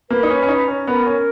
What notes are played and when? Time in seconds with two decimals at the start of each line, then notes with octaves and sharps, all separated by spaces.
0.10 A#3 B4
0.23 D#4
0.30 C#4
0.43 C#4
0.48 D#4 A#5
0.68 C#4
0.87 B3 A#4
1.06 C#4